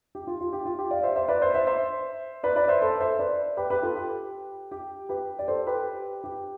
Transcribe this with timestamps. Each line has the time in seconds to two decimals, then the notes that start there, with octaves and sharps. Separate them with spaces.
0.15 G4
0.27 F4
0.41 F4
0.53 G4
0.65 F4
0.79 G4
0.91 D5 F5
1.03 C5 E5
1.16 C5 E5
1.28 B4 D5
1.42 C5 E5
1.54 C5 E5
1.67 C5 E5
2.43 B4 D5
2.56 B4 D5
2.68 C5 E5
2.81 A4 C5
3.00 C5 E5
3.19 B4 D5
3.57 G4 B4
3.70 G4 B4
3.82 F4 A4
3.95 G4
4.71 G4
5.09 G4 B4
5.39 D5
5.48 A4 C5
5.67 G4 B4
6.24 G4